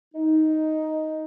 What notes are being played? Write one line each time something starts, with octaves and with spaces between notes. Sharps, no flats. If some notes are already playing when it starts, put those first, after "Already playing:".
D#4